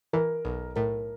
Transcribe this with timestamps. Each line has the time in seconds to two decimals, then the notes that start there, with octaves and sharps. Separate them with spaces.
0.13 E3 A#4
0.45 B1
0.76 A2 A#4